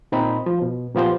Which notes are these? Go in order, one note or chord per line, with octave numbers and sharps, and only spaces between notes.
A#2 C4 D#4 B5
F3
B2
A#2 F3 B3 F4 G4 C5